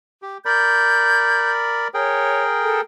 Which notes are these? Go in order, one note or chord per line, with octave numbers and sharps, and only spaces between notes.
G4
A#4 D5 B5 G6
G#4 A#4 C#5 G5
A4